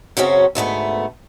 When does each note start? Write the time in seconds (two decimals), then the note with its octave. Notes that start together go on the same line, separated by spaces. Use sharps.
0.17 F#2 C#3 F#3 C4 C#4
0.55 D2 G#2 A3 B3